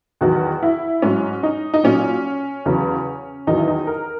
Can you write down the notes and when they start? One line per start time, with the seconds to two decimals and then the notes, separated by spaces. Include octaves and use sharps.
0.21 E2 D#3 F#3 F#4
0.63 E4
1.02 G#2 F#3 C#4
1.43 D#4
1.74 D#4
1.84 A#2 F#3 C#4
2.66 E2 C#3 F#3
3.47 E2 D#3 F#3 D#4
3.57 E4
3.68 D#4
3.87 A#4